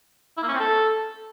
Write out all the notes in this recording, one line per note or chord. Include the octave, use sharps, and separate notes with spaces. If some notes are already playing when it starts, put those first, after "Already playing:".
E4
A#3
C#4
C4
A4